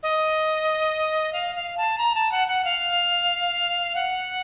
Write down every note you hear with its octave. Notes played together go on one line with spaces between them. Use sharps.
D#5
F5
F5
A5
A#5
A5
F#5
F#5
F5
F#5